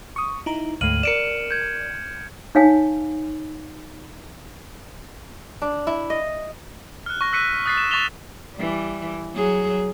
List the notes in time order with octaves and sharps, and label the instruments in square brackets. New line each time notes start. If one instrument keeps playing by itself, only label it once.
[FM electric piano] C#6 D#6
D#4 E4 A#5
[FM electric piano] D2 G#2 A3 [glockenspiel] F6 D#7 F#7
[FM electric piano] A#4 D5 [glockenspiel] C#7 D7 E7
[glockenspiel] G6 G#6
[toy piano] D#4 C#5 F5 G#5
[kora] D4
E4
D#5
[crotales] F6 F#6
C#6 A#6
E6 F#6 B6 C#7 D#7
D#6 F#6 A6 B6 C7
E7
C#6 A6 B6 E7 F7 G7
[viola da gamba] E3 G3
F#3 G#4